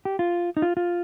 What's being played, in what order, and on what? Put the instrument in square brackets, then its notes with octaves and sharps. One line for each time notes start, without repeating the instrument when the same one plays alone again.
[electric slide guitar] G4
F4
D#4
F4
F4